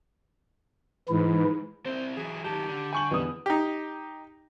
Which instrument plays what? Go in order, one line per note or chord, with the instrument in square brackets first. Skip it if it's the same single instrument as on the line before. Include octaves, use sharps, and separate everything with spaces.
[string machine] G#2 [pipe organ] E3 E4
[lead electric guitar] C4 E4 [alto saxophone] C5
[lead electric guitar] E3 F#3 [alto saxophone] G#4
[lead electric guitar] D#3 F#3 [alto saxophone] G4 [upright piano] A5
[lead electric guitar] D3
[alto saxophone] G5 [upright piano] G#5 C#6 F#7
[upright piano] E2 B3 D#6 [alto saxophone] G3
[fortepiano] D#4 G4